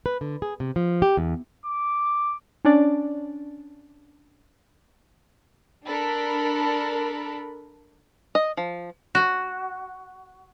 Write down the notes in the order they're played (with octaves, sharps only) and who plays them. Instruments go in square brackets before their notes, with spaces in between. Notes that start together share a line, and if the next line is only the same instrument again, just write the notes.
[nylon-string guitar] B4
D3
G#4
C3
F3
G4
E2
[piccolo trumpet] D6
[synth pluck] C#4 D4 D5
[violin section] D4 A4 A#4 B5
[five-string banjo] D#5
F3
[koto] F#4